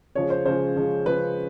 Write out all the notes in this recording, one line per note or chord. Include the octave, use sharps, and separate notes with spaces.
C#3 F3 G#3 C#5
C5
C#3 F3 G#3 C5
C#3 F3 G#3
C#3 F3 G#3 B4